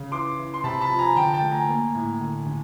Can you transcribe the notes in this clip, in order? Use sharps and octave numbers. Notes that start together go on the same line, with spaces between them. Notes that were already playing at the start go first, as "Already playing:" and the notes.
Already playing: C#3
E3 C6 D6
E3
C6
C3 A5 B5
A5 B5
F3
G#5 A#5
D3 G5 A5
G5 A5
A3
G#5 A#5
A#3
A2
D3
D3